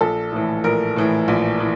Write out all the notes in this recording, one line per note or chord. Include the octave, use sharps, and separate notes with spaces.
A#1 A4
A2 E3
A#1 A#4
A2 E3
A#1
E3